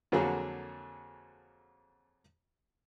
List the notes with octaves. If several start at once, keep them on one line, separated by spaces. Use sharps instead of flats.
F2 D3 F#3 A#3 F#4 G#4